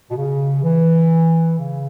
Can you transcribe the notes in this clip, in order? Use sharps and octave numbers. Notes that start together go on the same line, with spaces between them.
B2
C#3
E3
C#3